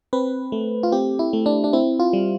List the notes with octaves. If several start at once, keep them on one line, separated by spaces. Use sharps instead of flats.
C4 B4
A3
F4
C4 G4
E4
A3
D4
D4
C4 E4
F4
G3